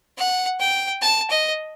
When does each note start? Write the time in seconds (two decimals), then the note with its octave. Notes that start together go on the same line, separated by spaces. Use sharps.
0.17 F#5
0.59 G5
1.02 A5
1.30 D#5